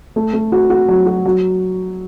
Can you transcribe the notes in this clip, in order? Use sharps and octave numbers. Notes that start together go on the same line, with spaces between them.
A3
A3
F#4
F#4
F#3
F#4
F#3